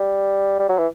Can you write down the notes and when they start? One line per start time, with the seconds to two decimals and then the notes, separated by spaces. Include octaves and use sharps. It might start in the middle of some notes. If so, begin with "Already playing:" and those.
Already playing: G3
0.59 G3
0.69 F#3
0.78 E3